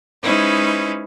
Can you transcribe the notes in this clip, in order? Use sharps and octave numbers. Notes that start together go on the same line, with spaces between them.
G#3 C#4 D#4 E4 B4 C5